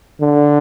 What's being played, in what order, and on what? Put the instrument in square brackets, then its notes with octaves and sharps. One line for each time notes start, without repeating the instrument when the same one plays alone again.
[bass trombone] D3